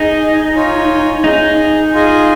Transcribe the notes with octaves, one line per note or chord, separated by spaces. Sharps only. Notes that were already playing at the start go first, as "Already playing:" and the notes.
Already playing: D#4 G#4 D#5 G#5
F4 C#5 G#5
D#4 G#4 D#5 G#5
F4 G#4 D#5 G#5